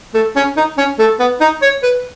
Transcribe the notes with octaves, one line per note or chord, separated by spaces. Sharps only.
A3
C#4
D#4
C#4
A3
B3
D#4
C#5
B4